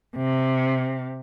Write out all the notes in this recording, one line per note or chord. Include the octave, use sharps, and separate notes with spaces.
C3